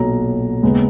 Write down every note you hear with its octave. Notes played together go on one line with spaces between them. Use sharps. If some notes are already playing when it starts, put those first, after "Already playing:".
Already playing: B1 A#2 F#3 A#5
D#2 C#3 G#3 B3